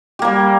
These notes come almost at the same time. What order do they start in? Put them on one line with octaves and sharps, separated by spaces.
G4 A#3 G3